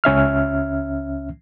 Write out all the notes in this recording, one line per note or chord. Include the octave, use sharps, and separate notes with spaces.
C#2 C#4 E5 F6